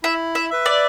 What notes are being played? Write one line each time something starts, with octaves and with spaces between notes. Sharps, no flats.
E4 E5
E5
B4 E5
D5